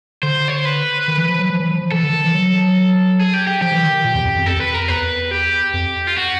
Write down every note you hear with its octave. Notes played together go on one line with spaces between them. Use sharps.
D3 C5
C#5
C5
B4
D#3
E3
F3
F#3
F3
E3
F3
F3
E3 A4
D3
D#3
E3
F#3
G#4
G4
G4
F3 G4
E3
D#3
D#3
A#2
E2
F2
F2
F2 A4
F2
B4
A#4
E2 B4
G4
F2
F4
F#4